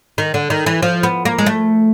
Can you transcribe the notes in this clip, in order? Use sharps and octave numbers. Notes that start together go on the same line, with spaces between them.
D#3
D3
D#3
E3
F3
B3
A#3
G#3
A3